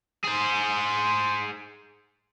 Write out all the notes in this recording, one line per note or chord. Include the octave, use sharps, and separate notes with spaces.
G#4 C5